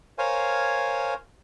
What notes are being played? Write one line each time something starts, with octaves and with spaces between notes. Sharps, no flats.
A#4 C5 C#5 F5 G#5